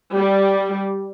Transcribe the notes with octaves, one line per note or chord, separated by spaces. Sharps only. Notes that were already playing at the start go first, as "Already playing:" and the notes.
G3